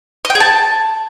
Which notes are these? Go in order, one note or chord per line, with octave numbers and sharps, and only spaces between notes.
D#5
G5
G#4
A5